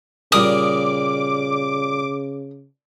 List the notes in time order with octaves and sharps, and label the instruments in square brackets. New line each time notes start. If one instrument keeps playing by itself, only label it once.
[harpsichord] A#2 G3 A#4 [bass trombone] C#3 [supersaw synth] D6 [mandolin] D#6